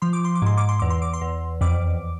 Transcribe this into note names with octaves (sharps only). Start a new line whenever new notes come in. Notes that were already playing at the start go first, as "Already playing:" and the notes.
F3 C6
D6
C6
D6
G#2 C6
D6
C6
E2 D6
C6
D6
C6
E2
F2 D6